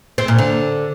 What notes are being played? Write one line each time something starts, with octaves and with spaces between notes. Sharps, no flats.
C4
A#2
D3